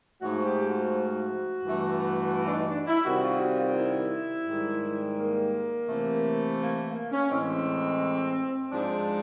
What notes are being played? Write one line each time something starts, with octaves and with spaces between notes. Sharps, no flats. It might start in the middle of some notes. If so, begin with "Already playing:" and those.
G#2 F3 A3 F#4
G4
F#4
G2 E3 A3
E4
D4
D#4
D4
E4
C3 D#3 G3 F#4
F4
F#4
F4
E4
G#2 D#3 G3
A#3
C3 E3 A3
A#3
A#3
A#3
C#4
A2 E3 G#3 C4
G#2 F3 G#3 D4